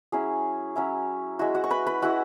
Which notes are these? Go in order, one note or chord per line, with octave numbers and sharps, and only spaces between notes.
F#3 C#4 E4 G#4
F#3 C#4 E4
G#3 E4 F#4
F#4 F#5
C#6
B4 B5
B4 B5
G#3 E4 F#4 F#5